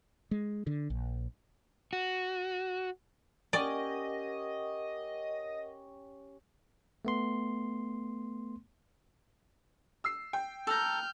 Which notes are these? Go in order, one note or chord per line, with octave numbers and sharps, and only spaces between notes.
G#3
D3
A#1
F#4
C#4 G4 A#4 D5 D#5 F#5
A3 B3 C6
E6 C7
G5
A4 A#5 F6 G6